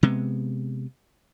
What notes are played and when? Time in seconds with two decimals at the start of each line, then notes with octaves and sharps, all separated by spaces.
0.03 C3 G#3 B3